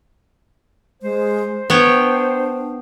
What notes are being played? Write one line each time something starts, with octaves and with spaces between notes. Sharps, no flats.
G#3 C5
B3 D4 C#5 G5